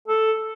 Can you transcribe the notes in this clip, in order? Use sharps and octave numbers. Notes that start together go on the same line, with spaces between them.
A4